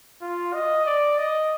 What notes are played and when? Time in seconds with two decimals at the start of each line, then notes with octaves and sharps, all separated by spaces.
0.22 F4
0.54 D#5
0.86 D5
1.18 D#5